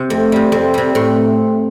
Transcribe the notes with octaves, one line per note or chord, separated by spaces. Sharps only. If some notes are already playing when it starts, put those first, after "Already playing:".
Already playing: C3
F2 A3 C4
C3 G3
F2 A3 C4
C3 G3
A2 A3 C4